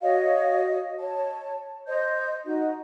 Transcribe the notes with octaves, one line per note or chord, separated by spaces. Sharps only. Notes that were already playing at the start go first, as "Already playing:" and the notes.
F#4 C#5 D#5 F5
C#5 A5
C5 D#5 G6
D#4 F#4 D#5